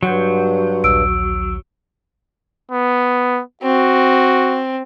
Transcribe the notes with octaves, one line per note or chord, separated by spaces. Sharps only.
G2 F#3 F#5 C6 G6
A#1 D#2 E6 D7
B3
C4 F#4